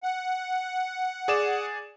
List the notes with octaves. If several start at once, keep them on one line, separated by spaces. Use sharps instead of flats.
F#5
G#4 D5 E7